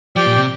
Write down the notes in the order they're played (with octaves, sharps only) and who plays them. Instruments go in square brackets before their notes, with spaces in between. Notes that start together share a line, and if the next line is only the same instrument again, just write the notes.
[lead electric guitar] F3 [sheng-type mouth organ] G4 D5 G5
[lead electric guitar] A#2
C3